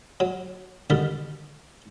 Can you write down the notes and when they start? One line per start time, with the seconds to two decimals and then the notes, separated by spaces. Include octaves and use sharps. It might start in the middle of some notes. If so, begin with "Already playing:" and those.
0.20 F#3
0.90 B2 D3 D#3 G3